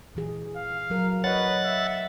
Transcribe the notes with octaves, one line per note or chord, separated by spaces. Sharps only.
A#2 E3 G#4
F5
F#3 A#4
B4 C#5 D#5 F#5 A6
E5